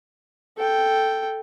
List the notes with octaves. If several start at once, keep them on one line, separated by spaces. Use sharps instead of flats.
A4 G5